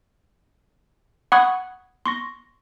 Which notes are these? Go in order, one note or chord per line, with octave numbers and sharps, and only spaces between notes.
F#5 B5 C#6 D#6 F#6 G#6
C6 C#6 A#6